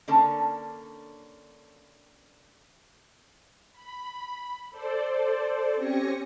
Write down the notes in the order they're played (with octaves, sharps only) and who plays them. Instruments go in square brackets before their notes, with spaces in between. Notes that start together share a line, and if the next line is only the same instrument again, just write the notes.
[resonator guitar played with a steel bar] D3 A#3 C#4 A4 A5
[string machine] B5
A4 C5 D5
C4 C#4 G4 G#5 A#6 C#7